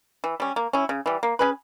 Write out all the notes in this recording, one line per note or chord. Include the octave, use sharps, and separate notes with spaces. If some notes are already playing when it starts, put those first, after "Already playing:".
E3
G3 C#4
A#3
C#4 E4
C#3
E3 G3
A#3
C#4 G#4 B4